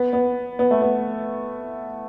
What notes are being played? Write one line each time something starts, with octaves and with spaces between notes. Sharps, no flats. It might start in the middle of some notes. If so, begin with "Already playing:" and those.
Already playing: B3
B3
B3
A3
B3